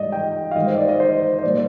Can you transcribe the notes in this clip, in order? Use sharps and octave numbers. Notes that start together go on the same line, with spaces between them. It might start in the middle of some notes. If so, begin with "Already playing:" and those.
Already playing: G#2 G3 D5 D#5
G5
F5
G#2 D#3 G3 D#5
C5
D5
D#5
C5
C5
A#2 G3 D5